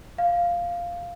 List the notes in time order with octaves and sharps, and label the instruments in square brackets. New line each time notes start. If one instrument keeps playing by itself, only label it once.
[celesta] F5